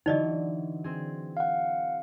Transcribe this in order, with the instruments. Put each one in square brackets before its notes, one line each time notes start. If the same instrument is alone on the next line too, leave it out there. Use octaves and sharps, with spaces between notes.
[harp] D3 E3 F#3 [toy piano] D#4 D5 D#5
[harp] C4 G#4
[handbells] F5 F#5